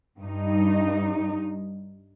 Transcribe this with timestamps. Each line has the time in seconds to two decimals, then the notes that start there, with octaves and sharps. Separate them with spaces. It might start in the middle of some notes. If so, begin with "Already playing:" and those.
0.20 G2 D#4